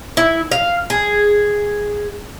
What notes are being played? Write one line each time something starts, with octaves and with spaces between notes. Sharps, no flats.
E4
F5
G#4